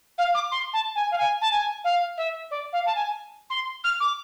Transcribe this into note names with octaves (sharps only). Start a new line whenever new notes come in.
F5
D6
C6
A5
G#5
F5
G#5
A5
G#5
F5
E5
D5
F5
A5
G#5
C6
F6
D6